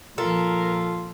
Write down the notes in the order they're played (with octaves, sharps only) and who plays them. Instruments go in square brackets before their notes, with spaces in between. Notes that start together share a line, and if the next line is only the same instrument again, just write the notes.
[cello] A#2 F3 [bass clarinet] F4 [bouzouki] A4 [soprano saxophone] A#4